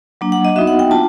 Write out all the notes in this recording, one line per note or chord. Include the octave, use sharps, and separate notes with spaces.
F#3 A#3 D4
F#5
D#5
B3 D#4 F#4 E5
F#5
G5
A#3 D4 F4 A5